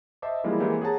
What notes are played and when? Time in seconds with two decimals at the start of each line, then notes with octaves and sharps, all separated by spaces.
0.22 C5 D#5 E5 A5 D6
0.44 E3 F3 G3 G#3 A#3 E4
0.60 E3 G#3 A#3 C4 G4 C5
0.81 G#4 C#5 F#5 A5 A#5